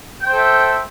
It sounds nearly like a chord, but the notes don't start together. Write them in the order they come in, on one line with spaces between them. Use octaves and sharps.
G5 C5 A4 E5